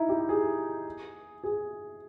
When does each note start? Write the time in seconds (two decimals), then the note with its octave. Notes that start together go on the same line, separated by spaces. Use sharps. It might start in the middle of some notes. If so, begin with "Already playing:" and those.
Already playing: D#4 E4
0.09 G4
0.29 G#4
1.44 G#4